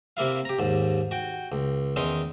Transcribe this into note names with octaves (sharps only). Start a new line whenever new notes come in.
C3 A#3 E4 F5
G4 A#5
D#2 G#2
F#4 G5
C#2
E2 D#3 C#4 D#4 C#5 C6